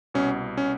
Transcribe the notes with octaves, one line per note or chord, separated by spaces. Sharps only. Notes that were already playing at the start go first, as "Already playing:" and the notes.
C2 B2 C#4
C#4